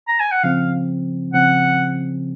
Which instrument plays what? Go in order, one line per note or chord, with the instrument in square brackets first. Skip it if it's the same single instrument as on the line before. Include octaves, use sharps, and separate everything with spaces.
[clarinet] A#5
G#5
F#5
[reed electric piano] C#3 F3 C4 [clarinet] F5
[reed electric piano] C#3 F3 C4 [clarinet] F#5